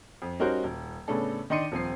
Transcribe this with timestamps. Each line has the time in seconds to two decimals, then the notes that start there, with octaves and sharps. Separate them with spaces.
0.22 F2
0.39 G3 C#4 D#4 F#4 A#4 C5
0.64 D#1
1.08 A2 C#3 B3 C#4 D4 A4
1.50 D#3 D4 D#5 C6 C#7 D#7
1.72 D#1 F3 C4 C5 C7